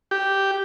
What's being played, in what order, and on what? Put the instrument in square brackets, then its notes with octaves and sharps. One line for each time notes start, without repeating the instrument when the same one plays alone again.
[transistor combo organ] G4